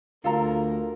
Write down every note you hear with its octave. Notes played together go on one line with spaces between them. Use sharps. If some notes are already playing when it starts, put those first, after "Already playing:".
D2 F4 A4 A#4 A#5